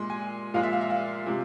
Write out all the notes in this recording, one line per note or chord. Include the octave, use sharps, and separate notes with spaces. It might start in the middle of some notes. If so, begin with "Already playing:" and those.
Already playing: A#2 G#3 C6
G#5
A#2 F3 G#3 F5
E5
F5
E5
F5
C3 F3 G#3